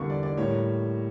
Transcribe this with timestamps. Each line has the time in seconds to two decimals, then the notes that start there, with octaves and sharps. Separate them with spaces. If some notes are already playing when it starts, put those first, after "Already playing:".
Already playing: E2 D3 G3 A#3 C#6
0.10 D5
0.23 D5
0.37 A2 G3 A#3 C#5